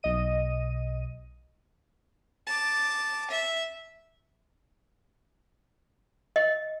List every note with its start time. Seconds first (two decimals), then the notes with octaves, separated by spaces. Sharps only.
0.03 B1 D#5 D#7
2.47 A5 D6
3.31 E5
6.36 D#5